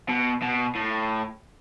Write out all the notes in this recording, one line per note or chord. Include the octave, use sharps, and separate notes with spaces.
B2
B2
A2